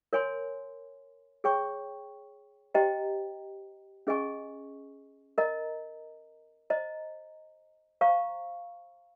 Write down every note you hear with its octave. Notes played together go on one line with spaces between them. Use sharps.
A#4 C#5 G#5 C6
G#4 C#5 G5 C#6
G4 C5 D#5 G5 A#5
C#4 G#4 D#5 G#5 C#6
A#4 D#5 A#5
C5 D#5 A#5
C5 F5 A#5 C#6